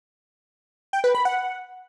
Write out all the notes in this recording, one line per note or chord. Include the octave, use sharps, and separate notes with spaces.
G5
B4
B5
F#5